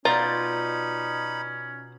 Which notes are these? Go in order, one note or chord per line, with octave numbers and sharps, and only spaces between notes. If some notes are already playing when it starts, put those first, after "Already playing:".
B2 C#4 D#4 F4 D5 A#5 B5 G6